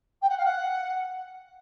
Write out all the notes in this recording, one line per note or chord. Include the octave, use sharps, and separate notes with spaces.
G5
F#5
F5
F#5